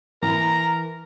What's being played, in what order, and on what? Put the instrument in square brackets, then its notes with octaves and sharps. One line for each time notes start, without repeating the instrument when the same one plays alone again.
[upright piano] E3 [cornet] A#4 [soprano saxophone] A#5